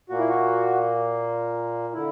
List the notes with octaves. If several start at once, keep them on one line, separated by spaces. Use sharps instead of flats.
A#2 A#3 F#4
E4
F#4
D3 E4